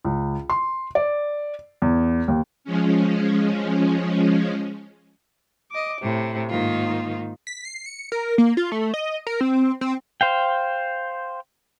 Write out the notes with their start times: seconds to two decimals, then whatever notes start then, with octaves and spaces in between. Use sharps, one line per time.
0.05 C#2
0.50 C6
0.95 D5
1.82 E2
2.28 D#2
2.64 F3 G#3 C#4
5.71 D#5 D6
6.01 A2 C3
6.49 G#2 D#3 A#3 D#4 F4
7.47 B6
7.65 C7
7.86 C#7
8.12 A#4
8.38 A#3
8.57 F4
8.72 A3
8.94 D#5
9.27 A#4
9.41 C4
9.81 C4
10.21 C5 F5 G5